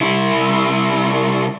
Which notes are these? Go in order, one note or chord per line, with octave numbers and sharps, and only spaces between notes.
C2 E4